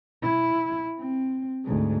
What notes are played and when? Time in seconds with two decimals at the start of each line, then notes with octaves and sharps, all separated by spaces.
0.23 E4
1.00 C4
1.64 D2 G#2